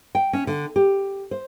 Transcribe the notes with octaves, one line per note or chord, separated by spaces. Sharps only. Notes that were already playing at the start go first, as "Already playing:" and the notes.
G5
C#4
D3
G4
C5